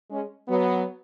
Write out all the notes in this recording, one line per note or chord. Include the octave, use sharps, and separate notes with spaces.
G#3 C#4
F#3 B3